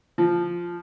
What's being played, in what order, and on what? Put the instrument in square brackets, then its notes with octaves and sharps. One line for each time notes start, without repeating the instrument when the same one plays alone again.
[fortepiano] F3